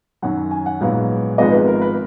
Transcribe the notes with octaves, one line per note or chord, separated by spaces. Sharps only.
F#2 D#3 F#3 F#5
G#5
F#5
A#1 G#2 F#3 B3 F5
G#1 G#2 F3 G#3 B3 D#5
B4
A#4
B4